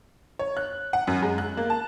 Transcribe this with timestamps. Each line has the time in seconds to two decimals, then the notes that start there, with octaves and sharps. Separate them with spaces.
0.39 C#5
0.57 F#6
0.93 F#5
1.07 F#2
1.22 G#3
1.38 F#6
1.57 A#3
1.70 A5